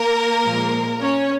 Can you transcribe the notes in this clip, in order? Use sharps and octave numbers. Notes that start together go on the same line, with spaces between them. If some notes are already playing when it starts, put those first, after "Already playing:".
Already playing: A#3 A#4
A#2 F3 G#3
C#4 C#5